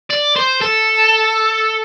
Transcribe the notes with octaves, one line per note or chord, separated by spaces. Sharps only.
D5
C5
A4